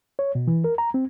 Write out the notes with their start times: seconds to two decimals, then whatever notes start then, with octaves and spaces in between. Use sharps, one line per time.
0.19 C#5
0.35 B2
0.47 E3
0.64 A#4
0.78 A#5
0.94 C4